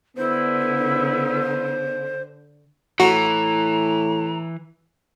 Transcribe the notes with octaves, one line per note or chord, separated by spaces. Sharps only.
D3 B3 E4 C5
A2 E3 F#4 A#5